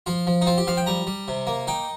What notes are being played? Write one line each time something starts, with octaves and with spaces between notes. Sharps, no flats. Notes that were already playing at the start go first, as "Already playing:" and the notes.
F3 F4
F3
D#4
C4 F4
G4
F3 F5
G5
G3 A#5
G3
C3
A#3
D#4 G5